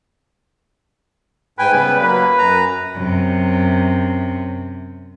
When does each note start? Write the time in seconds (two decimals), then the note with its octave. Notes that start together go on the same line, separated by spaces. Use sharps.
1.59 G#2 B4 G5 G#5
1.72 C#3 G3 B3
2.00 F#3 A#3 B4
2.38 F#2 A#5
2.95 F#2 C3